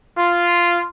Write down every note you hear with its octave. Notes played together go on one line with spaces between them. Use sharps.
F4